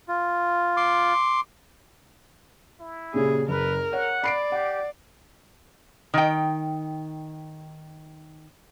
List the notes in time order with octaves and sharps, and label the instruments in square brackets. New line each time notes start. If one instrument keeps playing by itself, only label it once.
[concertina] F4
[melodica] C6 D6
[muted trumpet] E4
[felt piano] A#2 C#3 G4 [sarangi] G#4
[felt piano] F#1 [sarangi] A#4 [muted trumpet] B4
[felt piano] C#5 [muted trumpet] F#5
[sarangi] D5 [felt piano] B5 C7 D7
[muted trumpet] G4 [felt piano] F#5
[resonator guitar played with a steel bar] D#3 G5